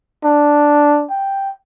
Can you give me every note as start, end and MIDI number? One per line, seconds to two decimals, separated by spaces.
0.25 1.04 62
1.11 1.52 79